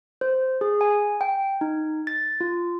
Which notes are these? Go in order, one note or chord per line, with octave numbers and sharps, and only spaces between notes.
C5
G#4
G#5
G5
D#4
A6
F4